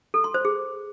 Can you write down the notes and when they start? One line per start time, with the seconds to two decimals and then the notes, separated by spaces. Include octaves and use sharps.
0.14 A4
0.24 C6
0.34 C5
0.45 G#4